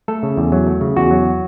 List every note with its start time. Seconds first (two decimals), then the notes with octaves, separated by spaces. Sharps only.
0.08 A3 A4
0.23 C#3
0.37 E2
0.52 F#3
0.67 A3
0.81 C#3
0.97 E2 F#4
1.11 F#3